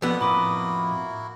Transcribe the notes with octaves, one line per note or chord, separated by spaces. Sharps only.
F2 F3 B3 A4 D5 F#5
A2 A#3 E4 F#4 B5 D6 D#6